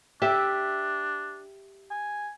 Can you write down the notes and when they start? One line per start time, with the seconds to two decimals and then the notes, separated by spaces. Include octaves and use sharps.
0.22 D4 G4 E5
1.91 G#5